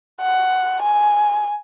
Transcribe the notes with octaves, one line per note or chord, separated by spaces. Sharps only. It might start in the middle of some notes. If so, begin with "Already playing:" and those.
F#5
G#5